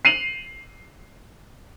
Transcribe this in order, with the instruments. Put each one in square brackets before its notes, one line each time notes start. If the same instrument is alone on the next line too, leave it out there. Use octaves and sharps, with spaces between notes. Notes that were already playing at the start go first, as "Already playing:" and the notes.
[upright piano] C7 D#7 F7 F#7